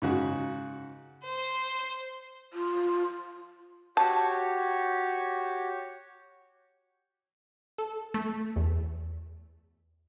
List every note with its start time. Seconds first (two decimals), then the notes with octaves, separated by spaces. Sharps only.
0.02 G#2 C#3 F#4
1.25 C5
2.53 F4
3.97 F#4 G4 C#5 A5
7.78 A4
8.14 A3
8.56 E2